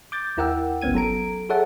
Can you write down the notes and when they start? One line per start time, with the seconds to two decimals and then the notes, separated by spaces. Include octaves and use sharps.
0.12 D6 G6 A6
0.37 D#2 E4 A#4 F#5 G5 E6
0.81 G1 C#2 B3 C#4 G#6 D#7
0.94 F#3 A4 A#5 D7
1.49 G#4 A4 C#5 E5 F#5 A5